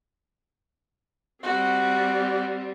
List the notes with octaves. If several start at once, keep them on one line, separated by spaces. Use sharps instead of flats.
G3 C4 F#4